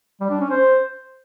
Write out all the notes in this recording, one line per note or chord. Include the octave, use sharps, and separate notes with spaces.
G3
D4
C#4
C5